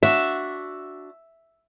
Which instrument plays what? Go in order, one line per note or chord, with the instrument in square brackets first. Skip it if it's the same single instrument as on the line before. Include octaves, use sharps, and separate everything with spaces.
[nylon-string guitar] D4 F#4 [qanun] E5